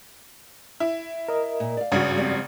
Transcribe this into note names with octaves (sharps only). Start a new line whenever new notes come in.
E4
A#4 D#5
A#2
D5 F5
G#1 G2 C#3 F#4
F3 G3 C4